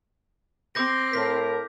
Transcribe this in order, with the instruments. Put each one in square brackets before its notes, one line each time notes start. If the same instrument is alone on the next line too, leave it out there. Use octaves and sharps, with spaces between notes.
[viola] C4 [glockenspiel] D6 G6 A#6
[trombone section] A2 A#4 [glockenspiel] B6